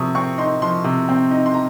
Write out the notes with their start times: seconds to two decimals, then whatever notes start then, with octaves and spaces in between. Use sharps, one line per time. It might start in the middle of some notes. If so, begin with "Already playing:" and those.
Already playing: C3 F3 C#6 D#6
0.15 C4 C#6
0.38 D#4 C6
0.62 F3 C6
0.84 C3
1.09 C4
1.31 D#4
1.46 C6
1.54 A#5